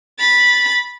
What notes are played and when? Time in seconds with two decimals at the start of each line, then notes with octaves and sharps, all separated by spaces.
0.19 B5 A6